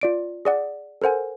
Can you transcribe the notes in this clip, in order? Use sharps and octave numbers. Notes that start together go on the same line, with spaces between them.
F4 D5 D7
G#4 D5 F#5
A4 A#4 C5 F#5 G#5